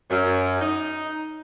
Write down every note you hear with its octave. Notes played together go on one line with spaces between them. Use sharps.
F#2
D#4